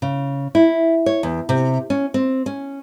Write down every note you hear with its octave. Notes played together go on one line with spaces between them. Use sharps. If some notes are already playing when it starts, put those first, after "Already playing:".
C#3
E4
C#5
E2
C3
C#4
C4
C#4